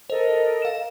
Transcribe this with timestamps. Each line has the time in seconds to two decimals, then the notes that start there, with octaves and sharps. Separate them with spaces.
0.10 A4 A#4 C5 D#5
0.62 F5 E7